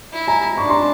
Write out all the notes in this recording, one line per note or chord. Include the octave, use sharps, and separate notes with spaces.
E4
G#5 A#5
D4 B5 C#6
A#5 C6